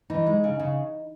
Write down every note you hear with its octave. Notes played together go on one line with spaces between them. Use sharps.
E3 D#4
G#3
C#3
C#3